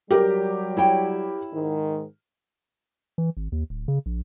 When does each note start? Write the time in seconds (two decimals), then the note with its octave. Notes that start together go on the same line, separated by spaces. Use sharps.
0.11 F#3 G3 G4 A#4
0.77 E4 C#5 G5
1.54 G#2 D#3
3.18 E3
3.37 G#1
3.52 D#2
3.70 D1
3.88 C#3
4.06 A#1